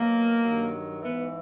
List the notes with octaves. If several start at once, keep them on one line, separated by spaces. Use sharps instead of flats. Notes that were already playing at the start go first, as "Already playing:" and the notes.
Already playing: B2 F#3 A#3
G2 D#3 F#3
G#2 E3 B3